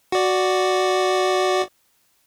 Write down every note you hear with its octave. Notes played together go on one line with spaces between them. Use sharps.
F#4 D5